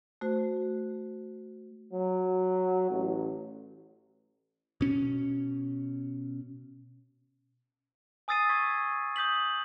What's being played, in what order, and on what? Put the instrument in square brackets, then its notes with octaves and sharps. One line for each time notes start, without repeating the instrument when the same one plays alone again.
[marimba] A3 F#4 C5
[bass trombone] F#3
A1
[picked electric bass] B2 C#4
[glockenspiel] G#5 D#6 E6 A6 C7 D#7
C#6 G#6 B6
D#6 G6 B6 F#7